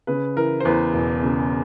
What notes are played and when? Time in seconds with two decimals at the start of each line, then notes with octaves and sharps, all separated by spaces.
0.07 C#3 B4
0.36 E3 A#4
0.60 C5
0.65 E2 B4
0.94 E1
1.23 C#3